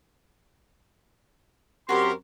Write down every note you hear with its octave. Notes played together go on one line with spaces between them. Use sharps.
F#2 C4 F#4 G4 A#4 C#5 B5 C6